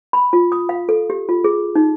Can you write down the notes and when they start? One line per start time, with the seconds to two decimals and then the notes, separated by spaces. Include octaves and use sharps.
0.13 B5
0.33 F4
0.52 D#6
0.69 F5
0.89 A4
1.10 G4
1.29 F4
1.44 G#4
1.76 D#4